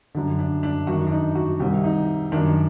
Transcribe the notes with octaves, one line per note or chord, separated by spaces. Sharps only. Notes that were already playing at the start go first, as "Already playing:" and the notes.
F#2 D3 D4
D4
D4
F#2 D#3 F#4
D4
D#4
F#4
C2 C3 D#3 G4
D#4
F#2 D#3 D4